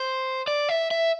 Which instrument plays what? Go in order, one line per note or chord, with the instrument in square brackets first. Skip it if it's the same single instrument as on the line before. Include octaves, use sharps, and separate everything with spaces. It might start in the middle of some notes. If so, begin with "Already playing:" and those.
Already playing: [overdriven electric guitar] C5
D5
E5
E5